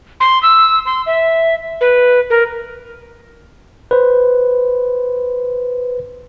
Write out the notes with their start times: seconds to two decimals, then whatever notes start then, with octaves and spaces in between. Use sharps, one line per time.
0.20 C6
0.43 E6
0.86 C6
1.06 E5
1.81 B4
2.30 A#4
3.91 B4 C5